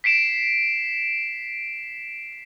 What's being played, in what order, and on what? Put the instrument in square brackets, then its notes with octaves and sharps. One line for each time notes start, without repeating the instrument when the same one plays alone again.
[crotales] B6 C7 D7 E7